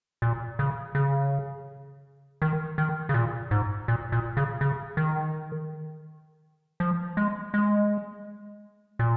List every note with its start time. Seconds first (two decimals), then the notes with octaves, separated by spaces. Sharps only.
0.22 A#2
0.59 C#3
0.95 C#3
2.42 D#3
2.78 D#3
3.09 C#3
3.14 A#2
3.51 G#2
3.88 A#2
4.12 A#2
4.37 C#3
4.61 C#3
4.97 D#3
6.80 F3
7.17 G#3
7.54 G#3
8.99 A#2